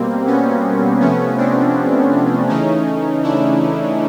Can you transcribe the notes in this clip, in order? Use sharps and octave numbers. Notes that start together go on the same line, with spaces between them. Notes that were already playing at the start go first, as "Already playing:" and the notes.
Already playing: B2 G3 A#3 C4
B3 C#4
C3 F3 A3 B3 C#4
C4 D4
C#3 E3 A3 C#4 D#4
D4 E4